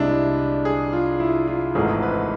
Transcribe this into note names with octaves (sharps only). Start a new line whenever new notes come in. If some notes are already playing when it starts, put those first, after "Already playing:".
Already playing: C2 C3 G#3 D4 E4
E4
G#4
F4
E4
F4
G#1 G#2 E3 A3 G#4
B4